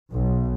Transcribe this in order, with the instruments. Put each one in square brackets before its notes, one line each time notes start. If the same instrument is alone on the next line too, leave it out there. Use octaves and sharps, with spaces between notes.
[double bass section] B1